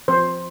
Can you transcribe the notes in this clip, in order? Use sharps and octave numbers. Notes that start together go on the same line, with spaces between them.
F3 C4 C5